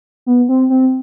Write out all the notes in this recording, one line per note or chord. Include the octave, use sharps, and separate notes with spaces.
B3
C4
C4